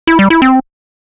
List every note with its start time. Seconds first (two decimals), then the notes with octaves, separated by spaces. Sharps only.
0.07 E4
0.19 G3
0.30 E4
0.42 C4